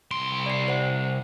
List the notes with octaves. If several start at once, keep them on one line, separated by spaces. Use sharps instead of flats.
C2 C6 D7
D5 C7
C5 F#5